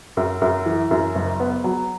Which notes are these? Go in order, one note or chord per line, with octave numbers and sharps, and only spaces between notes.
F#2
F#2
E3
F#2
F#1
B3
F#3